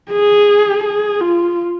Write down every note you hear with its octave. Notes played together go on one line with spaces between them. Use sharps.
G#4
G#4
F4